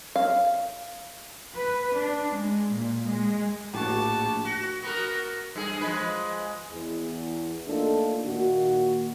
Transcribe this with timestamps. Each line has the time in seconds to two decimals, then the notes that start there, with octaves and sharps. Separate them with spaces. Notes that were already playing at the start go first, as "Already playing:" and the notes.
0.16 F5
1.57 B4
1.95 D4
2.36 G#3
2.74 A#2
3.06 G#3
3.74 A#1 A2 F#4 G4 A5
4.45 F#4
4.83 B3 F#4 A#4
5.56 G2 G#4
5.81 F3 G#3 B4
6.72 E2
7.67 A3 A#3 D4 D#4 F4 A4
8.26 A#2 D#3 F#4